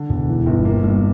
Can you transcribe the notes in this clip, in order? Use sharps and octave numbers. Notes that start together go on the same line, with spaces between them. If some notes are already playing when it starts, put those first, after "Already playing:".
Already playing: D3
E1
E3
G1
A#3
G2